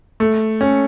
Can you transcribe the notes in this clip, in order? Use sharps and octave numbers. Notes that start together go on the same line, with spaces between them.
A3
C#4